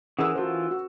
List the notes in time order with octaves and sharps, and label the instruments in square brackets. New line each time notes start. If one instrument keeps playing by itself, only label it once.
[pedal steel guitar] E3 G#4 [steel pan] C#4 A#4 [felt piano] F#5 E6
[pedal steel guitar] E3 F4 [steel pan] F#4 A4 C5
[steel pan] F#4